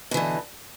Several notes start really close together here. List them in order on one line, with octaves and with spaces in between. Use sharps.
B2 E3 D3